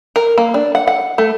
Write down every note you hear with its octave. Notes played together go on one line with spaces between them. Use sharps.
A#4
A#3
D4
F#5
F#5
A3